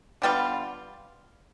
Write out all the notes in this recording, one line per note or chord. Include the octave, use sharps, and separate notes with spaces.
D3 G3 B3 F4